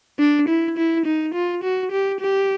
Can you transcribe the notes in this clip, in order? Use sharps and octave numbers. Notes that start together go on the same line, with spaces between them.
D4
E4
E4
D#4
F4
F#4
G4
G4